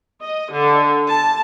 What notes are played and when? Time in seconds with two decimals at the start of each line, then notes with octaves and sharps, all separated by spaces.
0.21 D#5
0.50 D3
1.08 A5